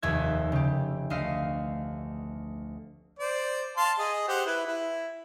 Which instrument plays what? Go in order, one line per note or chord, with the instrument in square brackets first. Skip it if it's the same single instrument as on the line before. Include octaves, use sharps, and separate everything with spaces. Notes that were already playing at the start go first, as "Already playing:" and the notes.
[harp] F1 D#2 E5 G#6
C#3 G4
D2 A3 D#5 F5 C7
[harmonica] C5 D5
F5 A5 C6
G#4 D#5
G4 C5 F#5
E4 B4
E4